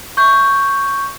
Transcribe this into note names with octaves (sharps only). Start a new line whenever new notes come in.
C#6 G6